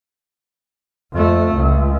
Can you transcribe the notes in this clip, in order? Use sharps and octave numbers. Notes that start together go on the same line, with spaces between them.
F2 A3
C#2